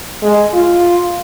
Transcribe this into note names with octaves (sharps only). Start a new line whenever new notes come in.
G#3
F4